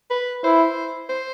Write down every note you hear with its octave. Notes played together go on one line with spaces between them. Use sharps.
B4
E4 C5
C5